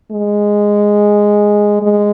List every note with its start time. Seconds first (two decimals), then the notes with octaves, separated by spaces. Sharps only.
0.12 G#3
1.83 G#3